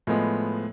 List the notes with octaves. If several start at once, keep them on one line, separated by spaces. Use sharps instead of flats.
A2 F3 G#3 B3